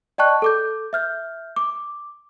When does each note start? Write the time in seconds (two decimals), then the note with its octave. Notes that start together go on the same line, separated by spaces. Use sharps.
0.18 D5 D#5 G5 A5 C#6 F#6
0.42 A4 D6 G6
0.93 E5 F6 G6
1.56 D6